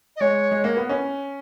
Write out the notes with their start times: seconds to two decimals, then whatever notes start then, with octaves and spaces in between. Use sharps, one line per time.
0.16 D#5
0.20 G#3 C#5
0.51 G#3
0.64 A#3
0.77 B3
0.89 C#4